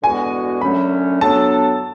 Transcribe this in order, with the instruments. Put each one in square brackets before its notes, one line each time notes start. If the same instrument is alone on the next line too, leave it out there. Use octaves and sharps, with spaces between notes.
[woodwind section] E2 D3 G#3 B3 F#4 [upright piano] G#5
[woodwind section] F#2 D3 F#3 A3 C#4 [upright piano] B5
[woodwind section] F#3 B3 D4 A4 [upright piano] A5